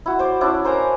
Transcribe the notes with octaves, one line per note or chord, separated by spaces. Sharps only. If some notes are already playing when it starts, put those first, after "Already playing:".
E4 F#4
C5 D5
C#4 D4 E4 D5
A#4 C5 G#5 A#5